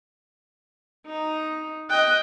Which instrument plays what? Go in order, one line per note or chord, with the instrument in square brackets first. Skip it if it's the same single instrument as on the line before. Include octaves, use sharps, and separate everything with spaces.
[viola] D#4
[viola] D#5 G5 [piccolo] F#6